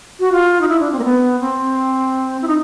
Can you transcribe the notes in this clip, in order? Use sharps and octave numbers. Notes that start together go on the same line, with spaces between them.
F#4
F4
D#4
E4
D4
C4
A#3
B3
C4
E4
D#4